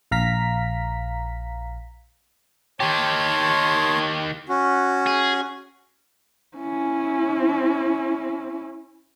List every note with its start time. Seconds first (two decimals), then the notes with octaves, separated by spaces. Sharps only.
0.11 A#1 F5 A#5 B6
2.80 D#3 G4 C#5 A5 C6
4.49 C#4 F#4
5.07 G#4
6.57 C#4 E4